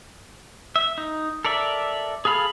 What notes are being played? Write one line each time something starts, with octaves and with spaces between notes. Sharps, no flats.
E5
D#4
A4 A#4 D5 E5
G#4 A4 F5 B5